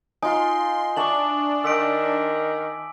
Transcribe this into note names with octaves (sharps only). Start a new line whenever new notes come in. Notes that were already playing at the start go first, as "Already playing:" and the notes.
D#4 F4 G#5 C6 D#6
D4 E5 A5 C#6 D6 F#7
D#3 E6 B6 D7